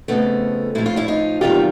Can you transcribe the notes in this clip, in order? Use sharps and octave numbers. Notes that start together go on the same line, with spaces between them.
F2 C#3 F3 A3 B3
A2 F3 E4
F4
D4 E4
D#4 F4
E2 C3 D#3 G3 F4 G4